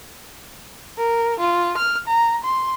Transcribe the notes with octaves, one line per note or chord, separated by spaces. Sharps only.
A#4
F4
F6
A#5
C6